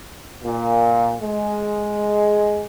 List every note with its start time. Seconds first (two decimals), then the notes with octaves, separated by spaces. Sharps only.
0.43 A#2
1.21 G#3